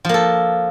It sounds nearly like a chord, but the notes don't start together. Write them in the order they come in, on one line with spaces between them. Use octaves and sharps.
F3 A#3 A4